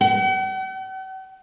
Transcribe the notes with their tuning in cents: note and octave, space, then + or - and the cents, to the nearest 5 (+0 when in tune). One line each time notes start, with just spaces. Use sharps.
F#5 +45